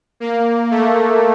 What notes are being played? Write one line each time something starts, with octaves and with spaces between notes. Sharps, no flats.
A#3
A3